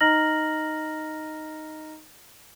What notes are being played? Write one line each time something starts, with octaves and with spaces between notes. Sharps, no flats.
D#4 D#5 A#5 F6 A#6 F#7